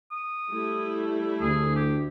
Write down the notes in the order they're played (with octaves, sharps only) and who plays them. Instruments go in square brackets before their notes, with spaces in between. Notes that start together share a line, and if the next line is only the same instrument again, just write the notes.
[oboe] D#6
[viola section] G3 A3 E4
[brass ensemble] D2 [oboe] G#4
[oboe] G4